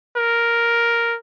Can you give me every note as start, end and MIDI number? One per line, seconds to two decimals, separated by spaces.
0.17 1.16 70